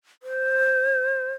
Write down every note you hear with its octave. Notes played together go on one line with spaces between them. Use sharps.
C5